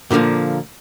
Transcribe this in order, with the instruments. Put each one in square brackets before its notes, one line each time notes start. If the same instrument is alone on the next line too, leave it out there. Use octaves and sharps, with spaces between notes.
[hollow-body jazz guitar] A#2 D3 E3 F3 A#3